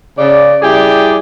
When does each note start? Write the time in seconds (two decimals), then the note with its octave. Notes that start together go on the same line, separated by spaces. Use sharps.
0.18 C#3 D5
0.62 G3 E4 G4 G#4 D5 G5